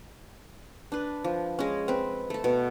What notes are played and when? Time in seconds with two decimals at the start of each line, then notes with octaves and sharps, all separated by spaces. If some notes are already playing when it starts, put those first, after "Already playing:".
0.92 D4 B4
1.24 F3
1.59 G#3 C#4
1.88 C4 B4
2.30 A3 A4
2.44 B2